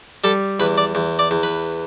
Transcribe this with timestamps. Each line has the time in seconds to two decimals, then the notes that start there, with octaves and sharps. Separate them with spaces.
0.24 G3 A4
0.60 E2 B4
0.78 D5
0.95 E2
1.19 D5
1.31 E2
1.43 B4